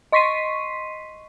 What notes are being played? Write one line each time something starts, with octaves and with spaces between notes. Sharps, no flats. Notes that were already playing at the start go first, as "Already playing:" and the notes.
D#5 C6 C#6 B6 C7 D#7